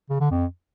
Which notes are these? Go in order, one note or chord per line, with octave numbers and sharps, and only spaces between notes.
C#3
D3
F2